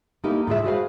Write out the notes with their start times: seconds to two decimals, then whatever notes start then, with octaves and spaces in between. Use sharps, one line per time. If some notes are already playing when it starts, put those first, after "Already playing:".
0.24 A#3 D#4 E4 G4 A4 A#4
0.47 A2 F4 G#4 E5
0.64 F#4 G#4 B4 C5 F5